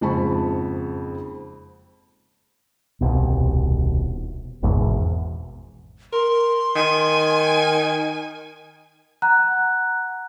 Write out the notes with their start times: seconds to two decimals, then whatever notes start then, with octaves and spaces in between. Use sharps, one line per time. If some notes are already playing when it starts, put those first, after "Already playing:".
0.01 F#1 F2 G#2 A5 B5 C#6
3.01 D#1 C2 B2
4.63 G#1 E2 G#2 B2
6.13 A#4 C6
6.76 D#3 G#5
9.22 F#5 A#5 F#6